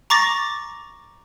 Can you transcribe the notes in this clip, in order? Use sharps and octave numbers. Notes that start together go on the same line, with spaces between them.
A#5 C#6 D6 A6 A#6